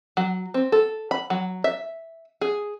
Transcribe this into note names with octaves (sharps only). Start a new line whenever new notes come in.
F#3
C4
A4
B5
F#3
E5
G#4